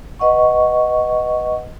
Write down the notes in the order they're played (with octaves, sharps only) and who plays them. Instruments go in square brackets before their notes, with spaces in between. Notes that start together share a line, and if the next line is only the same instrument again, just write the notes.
[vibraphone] B4 D#5 F#5 C#6